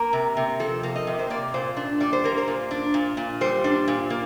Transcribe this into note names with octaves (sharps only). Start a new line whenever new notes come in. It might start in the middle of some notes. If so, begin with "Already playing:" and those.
Already playing: A#3 A#4
C3
C3
F3 A4
A#3
D#5
C3
C5
A#3 D5
A#2 C5
D4
G3 D5
C5
A#3 A#4
C5
A#2
D4
A#2
A#2
G3 C5
D4
A#2
A#3